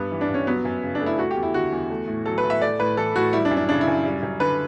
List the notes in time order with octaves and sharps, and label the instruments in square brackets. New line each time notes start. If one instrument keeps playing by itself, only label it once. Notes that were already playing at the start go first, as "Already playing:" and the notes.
Already playing: [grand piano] G2 G3 B3
E3
D4
G2 C#4
F#3 B3
F#2
C#3
D4
A3
E4
A3 F#4
G4
E2
E4
D3 F#4
E2
A3
A2
F#3 A4
B4
A2
E5
A3 D5
A2 B4
E3 A4
A2 F#4
G3 E4
D4
F#2
D4
C#3 D4
E4
F#2
G3
F#2
D3 B4